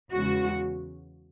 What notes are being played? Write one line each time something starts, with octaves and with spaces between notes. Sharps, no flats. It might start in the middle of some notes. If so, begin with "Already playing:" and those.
E2 C#3 G#3 F#4